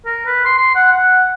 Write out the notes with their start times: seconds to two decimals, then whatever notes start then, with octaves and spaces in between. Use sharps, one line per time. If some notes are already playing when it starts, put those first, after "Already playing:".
0.06 A#4
0.26 B4
0.45 C6
0.58 C6
0.75 F#5
0.92 F#5